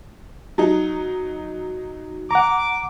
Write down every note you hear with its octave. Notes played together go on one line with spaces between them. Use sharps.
F#3 D#4
F#5 A#5 D6